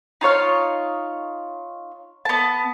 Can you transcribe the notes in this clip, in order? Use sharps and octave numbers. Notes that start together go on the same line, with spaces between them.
D#4 F4 C#5 F6
B3 A5